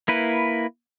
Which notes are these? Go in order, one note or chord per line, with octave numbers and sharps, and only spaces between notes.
A#3 E4 B4